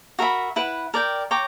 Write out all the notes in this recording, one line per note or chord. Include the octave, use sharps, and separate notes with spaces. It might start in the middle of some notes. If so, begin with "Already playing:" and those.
F#4 A#4 E5 B5
E4 B4 F#5
A#4 D5 G5
C#5 G5 A#5 D6